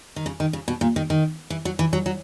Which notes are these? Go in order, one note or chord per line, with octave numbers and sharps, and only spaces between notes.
D#3
C#3
D#3
C#3
B2
A#2
D#3
D#3
E3
F#3
E3
F#3
F#3